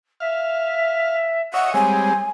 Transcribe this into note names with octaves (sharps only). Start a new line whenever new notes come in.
E5 F5
C#5 D#5 E5 F#5
G3 G#3 C4 C#5 G#5